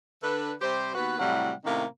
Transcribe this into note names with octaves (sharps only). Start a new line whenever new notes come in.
D3 D4 A4 B4
C3 G3 G4 C5
D#2 B3 F#4 B4
A2 C3 F#3 G3 E4 F#5
A2 C3 D#3 A#3 C#4 E4